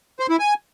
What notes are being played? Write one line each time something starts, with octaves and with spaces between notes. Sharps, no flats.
C5
E4
G#5